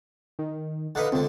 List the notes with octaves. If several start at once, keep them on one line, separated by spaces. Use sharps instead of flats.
D#3
D3 D#4 B4 F5 F#5
C#2 D3 C4